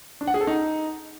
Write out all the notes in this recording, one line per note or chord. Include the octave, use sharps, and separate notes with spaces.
D4
F#5
G#4
A4
D#4